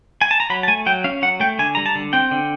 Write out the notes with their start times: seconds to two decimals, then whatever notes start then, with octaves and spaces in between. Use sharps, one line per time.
0.21 G#5
0.31 A5
0.40 A#5
0.50 F#3 B5
0.63 A5
0.68 A3 G#5
0.86 F#3 G5
1.04 C#4 F5
1.22 F#3 F#5
1.40 A3 G5
1.59 D3 G#5
1.75 G3 A#5
1.86 A5
1.95 D3
2.13 C4 G5
2.31 D3